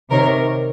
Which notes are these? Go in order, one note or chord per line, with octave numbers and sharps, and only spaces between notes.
C3 D#3 A#4 C#5